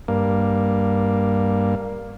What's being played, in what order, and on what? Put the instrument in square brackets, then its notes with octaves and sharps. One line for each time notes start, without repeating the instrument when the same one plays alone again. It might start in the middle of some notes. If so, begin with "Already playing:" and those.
[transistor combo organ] G2 A#3